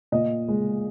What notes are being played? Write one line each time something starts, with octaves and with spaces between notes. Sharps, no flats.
A#2 D#5
G#3